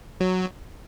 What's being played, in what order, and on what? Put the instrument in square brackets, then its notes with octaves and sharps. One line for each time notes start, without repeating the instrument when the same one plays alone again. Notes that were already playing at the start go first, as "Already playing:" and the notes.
[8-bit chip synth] F#3